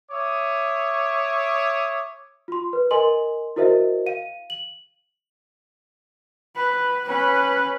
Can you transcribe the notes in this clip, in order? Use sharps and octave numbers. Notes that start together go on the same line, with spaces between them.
C#5 E5 D6 D#6
F4 C6
B4
A#4 D#5 G#5 C6 F#7
E4 F#4 A#4 C5 D#5 E5
F5 D#7
F#7
B4
C#4 B4